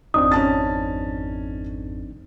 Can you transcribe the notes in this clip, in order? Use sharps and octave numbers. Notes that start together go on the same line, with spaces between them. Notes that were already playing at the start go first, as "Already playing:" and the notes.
G#1 F2 C4 D4 D#4 D#6
C#4 A5 A6